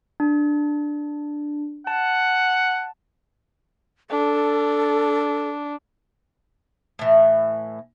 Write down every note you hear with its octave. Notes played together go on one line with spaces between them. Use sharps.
D4
F#5 A5
D4 A4
A2 E3